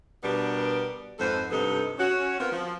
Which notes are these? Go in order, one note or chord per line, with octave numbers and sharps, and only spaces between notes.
B2 G3 B3 D4 G4 A#4
F2 G#2 A4 B4 C5
G2 C3 B3 D#4 A4
C#4 F#4
B3 C4 F4 A#4
F3